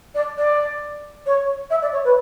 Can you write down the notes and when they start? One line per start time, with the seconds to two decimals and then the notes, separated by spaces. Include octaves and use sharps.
0.14 D5
0.37 D5
1.26 C#5
1.70 E5
1.81 D5
1.92 C#5
2.04 B4